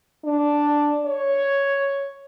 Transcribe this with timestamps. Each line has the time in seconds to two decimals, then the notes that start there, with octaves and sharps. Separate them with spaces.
0.25 D4
1.06 C#5